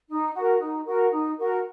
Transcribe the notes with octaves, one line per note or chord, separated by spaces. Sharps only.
D#4
F#4 A#4
D#4
F#4 A#4
D#4
F#4 A#4